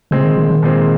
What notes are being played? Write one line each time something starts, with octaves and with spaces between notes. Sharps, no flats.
A#2 C#3 G#3 C4
D#3
D#3
D#3
A#2 G#3 C4